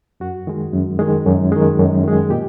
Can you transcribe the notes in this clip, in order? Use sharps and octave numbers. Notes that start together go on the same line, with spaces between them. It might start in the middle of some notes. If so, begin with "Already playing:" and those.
F#2 F#4
D#3 G#3
F#2
D#3 G#3
F#2
D#3 G#3
F#2
D#3 G#3
A#2 G4